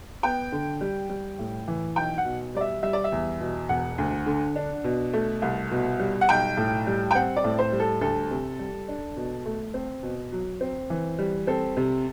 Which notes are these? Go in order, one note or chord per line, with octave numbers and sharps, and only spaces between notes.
B3 G5
D3
G3
G3
A2
E3
B1 G5
F#5
B2
G3 D5
E5
G3 E5
D5
E5
E2
B2
E1 F#5
D2
D3
D4
B2
A3
C2
B2
G3
F#5
B1 G5
A2
G3
G5
C4 F#5
D5
A2
C5
G3
A4
D2 A4
C3
G3
D4
B2
A3
C4
B2
F#3
C4
E3
G3
C4 A4
C3